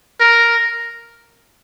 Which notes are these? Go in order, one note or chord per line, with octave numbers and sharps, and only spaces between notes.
A#4